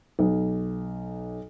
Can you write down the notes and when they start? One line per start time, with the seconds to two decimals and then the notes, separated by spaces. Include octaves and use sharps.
0.19 B1